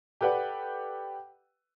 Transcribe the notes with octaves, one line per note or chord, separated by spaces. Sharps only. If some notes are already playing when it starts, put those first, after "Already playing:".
G4 A4 B4 D5 F#5